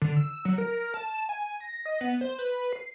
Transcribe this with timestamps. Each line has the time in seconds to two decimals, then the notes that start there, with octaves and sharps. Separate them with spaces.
0.02 D3
0.17 E6
0.45 F#3
0.58 A#4
0.94 A5
1.29 G#5
1.60 A#6
1.86 D#5
2.01 B3
2.21 C5
2.38 B4
2.73 C7